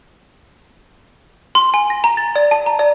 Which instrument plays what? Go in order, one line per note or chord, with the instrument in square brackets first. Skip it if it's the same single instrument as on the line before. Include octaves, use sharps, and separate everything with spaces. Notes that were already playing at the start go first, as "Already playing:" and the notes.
[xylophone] C6
G#5
A#6
A#5
A6
D5
A5
A#5
D5